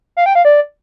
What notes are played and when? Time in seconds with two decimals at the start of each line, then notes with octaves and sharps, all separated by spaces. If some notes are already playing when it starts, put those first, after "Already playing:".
0.17 F5
0.26 G5
0.35 F5
0.45 D5